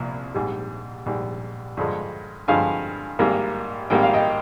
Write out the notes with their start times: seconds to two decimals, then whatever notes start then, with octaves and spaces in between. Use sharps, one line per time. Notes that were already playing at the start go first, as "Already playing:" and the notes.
Already playing: C2 A#2 F3
0.34 A#1 G#2 G3
1.06 A#1 G#2 G3
1.77 G2 D3 F3 G#3
2.48 G2 D3 F3 G#3 F5 G#5
3.19 G#1 G#2 G3 A#3
3.90 G#1 G#2 G3 A#3 G5
4.03 F5
4.14 D#5 G5